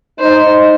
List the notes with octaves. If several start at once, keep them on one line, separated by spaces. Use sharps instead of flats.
D#4 C5